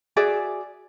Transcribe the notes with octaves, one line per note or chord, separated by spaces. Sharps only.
F#4 G#4 D5 E5